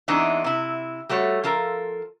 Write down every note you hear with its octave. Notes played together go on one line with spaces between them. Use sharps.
E2 E3 G#3 C4 D4 D#4
C3 E4
G3 A3 F#4 C#5
F3 F4 A4 A#4